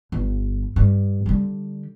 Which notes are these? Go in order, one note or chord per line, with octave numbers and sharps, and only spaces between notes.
G1
G2
D3 G3